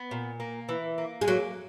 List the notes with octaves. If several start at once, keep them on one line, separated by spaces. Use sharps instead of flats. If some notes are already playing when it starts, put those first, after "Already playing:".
Already playing: B3
A#2
A#3
E3
A#3
G#3
F#3 A#3